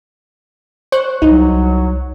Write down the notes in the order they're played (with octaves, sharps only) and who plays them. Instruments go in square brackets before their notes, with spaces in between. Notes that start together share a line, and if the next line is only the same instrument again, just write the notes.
[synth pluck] C5 C#6 F#6
[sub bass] C2 [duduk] F#3 [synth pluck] D#4